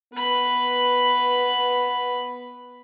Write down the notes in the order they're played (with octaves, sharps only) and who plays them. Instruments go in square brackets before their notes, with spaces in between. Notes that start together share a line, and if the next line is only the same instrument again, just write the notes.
[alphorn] B3 [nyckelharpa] B4 B5